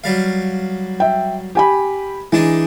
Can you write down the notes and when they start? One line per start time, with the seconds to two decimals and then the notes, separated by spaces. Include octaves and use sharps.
0.04 F#3 G3 F5
1.00 E5 G5
1.55 G4 G#5 B5
2.32 E3 G#3 D4 D#4